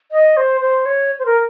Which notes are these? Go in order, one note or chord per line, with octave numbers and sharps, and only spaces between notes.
D#5
C5
C5
C#5
C5
A#4